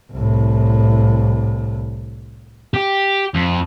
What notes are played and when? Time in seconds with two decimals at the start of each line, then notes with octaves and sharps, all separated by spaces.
0.12 C2 A2
2.74 G4
3.34 F2